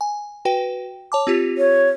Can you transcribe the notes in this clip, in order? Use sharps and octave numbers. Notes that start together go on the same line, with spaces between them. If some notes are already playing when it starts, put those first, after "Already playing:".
G#5
F#4 B4 G5
C#5 A5 D6
C4 F4 G4
C#5